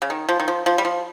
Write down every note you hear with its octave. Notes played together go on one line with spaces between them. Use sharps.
C#3
D#3
F3
D#3
F3
F3
G3
F3